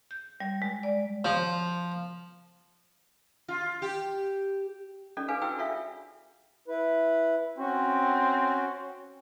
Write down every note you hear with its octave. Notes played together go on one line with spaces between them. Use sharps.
G6
G3
G#3
D5
F3
F4
G4
C#4 F4 A4 D5 D#5
D4 G#4 B4 F5 G#5
E4 F#4 B4 D5 G5 E6
F4 A4 C#5 E5 F5
E4 B4
C4 C#4 F#4